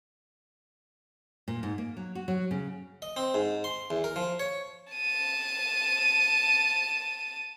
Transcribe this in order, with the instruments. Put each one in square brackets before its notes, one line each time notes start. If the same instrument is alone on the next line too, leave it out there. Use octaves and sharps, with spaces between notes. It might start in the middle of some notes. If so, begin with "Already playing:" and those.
[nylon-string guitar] A#2
G#2
A#3
F#3
F#4
F#3
C#3
[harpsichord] D#5
C4
G#2
C6
E2
A#4
F3
C#5
[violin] A5 D#7